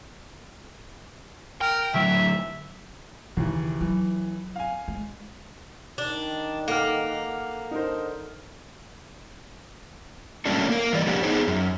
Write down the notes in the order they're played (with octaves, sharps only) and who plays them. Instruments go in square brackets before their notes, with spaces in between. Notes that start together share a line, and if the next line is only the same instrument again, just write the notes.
[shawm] A#4 [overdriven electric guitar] G5
[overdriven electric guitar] D2 F#3 [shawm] E5
[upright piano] D#2 E3 [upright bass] C#3
[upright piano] E3 [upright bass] F#3
[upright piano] F5 G#5
[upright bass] G#3
[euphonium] D#3 [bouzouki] D4
[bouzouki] A#3 [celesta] A4 [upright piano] F#5 D6 F6
[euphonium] D3 [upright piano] D#4 A#4 C5
[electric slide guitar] F#3 G3 A3 A#3 C#4 D4
A#3 A#4
E3 G3 D5
F3 G3 A#3 D4 F#4 G4
B3 C4 D#4 G#4 C5
F#2